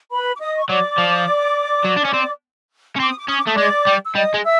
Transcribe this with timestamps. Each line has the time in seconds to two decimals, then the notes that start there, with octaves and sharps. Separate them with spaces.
0.11 B4 B5
0.35 D6
0.40 D#5 D#6
0.58 C#6
0.69 F#3 D5 D6
0.98 F3
1.84 F#3
1.96 D4
2.04 C#4
2.13 C4
2.96 C#4
3.00 C4 D6
3.09 D#6
3.19 D6
3.28 C#4 D#6
3.38 D6
3.47 A3 D#6
3.55 G#3 D5 D6
3.87 G3
4.06 E6
4.15 G3 D#5 D#6
4.34 G#3
4.44 E5 E6